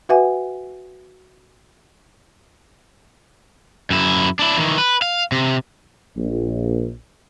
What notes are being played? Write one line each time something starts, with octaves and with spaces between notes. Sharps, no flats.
F#4 B4 E5 F#5 G#5
F#2 E4
D4 E4
D#3 E3
B4
F5
C3
A#1